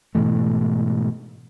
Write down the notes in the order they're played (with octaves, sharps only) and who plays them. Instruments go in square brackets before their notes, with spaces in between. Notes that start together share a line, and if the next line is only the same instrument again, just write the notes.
[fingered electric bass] G#2 B2 E3 A3